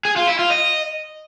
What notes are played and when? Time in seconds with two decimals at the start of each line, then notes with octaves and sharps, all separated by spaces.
0.05 G#4
0.16 F4
0.28 E4
0.39 F4
0.50 D#5